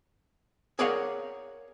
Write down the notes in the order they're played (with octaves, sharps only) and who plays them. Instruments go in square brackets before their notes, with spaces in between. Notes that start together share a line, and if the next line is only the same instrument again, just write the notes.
[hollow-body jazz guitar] G#4 A#4 C#5 D5 F5 F#5